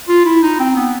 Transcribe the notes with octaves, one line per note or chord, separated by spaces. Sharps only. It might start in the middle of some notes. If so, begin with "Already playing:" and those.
F4
E4
D#4
C4
B3